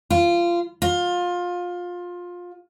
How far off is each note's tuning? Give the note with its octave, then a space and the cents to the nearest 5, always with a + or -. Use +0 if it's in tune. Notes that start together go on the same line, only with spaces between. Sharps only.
F4 -20
F4 +20